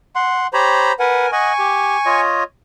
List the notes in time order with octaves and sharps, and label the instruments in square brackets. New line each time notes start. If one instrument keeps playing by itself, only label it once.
[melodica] F#5 C6
[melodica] G4 C#5 [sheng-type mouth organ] C5 A#5 B5
[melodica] A#4 G#5 [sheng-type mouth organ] B4 F#5
[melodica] D#5 F#5 [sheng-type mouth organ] G#5 C#6
[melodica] G4
F4 C#5 D#5